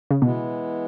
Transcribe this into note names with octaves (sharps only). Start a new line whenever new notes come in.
C#3
B2 E3 G#3 B3 E4